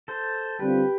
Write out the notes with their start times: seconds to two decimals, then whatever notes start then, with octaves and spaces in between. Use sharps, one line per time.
0.08 A4 C5
0.59 D3 G3 C4 F4 G4 B4